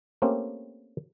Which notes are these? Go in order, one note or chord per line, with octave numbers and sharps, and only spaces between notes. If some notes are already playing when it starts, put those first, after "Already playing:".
A3 A#3 C4 C#4 G4